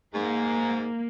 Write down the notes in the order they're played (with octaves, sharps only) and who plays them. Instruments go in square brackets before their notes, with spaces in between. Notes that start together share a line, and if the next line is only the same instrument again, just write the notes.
[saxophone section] G#2 [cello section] A#3